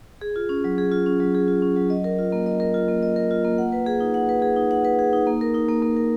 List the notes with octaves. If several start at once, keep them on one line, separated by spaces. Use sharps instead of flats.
G#4
F4
C#4
F#3
G#4
F4
C#4
F#3
G#4
F4
C#4
F#3
D#5
A#4
F4
A#3
D#5
A#4
F4
A#3
D#5
A#4
F4
A#3
F#5
B4
G#4
D#4
F#5
B4
G#4
D#4
F#5
B4
G#4
D#4
A#3
A#4
D#4
A#3
A#3
A#4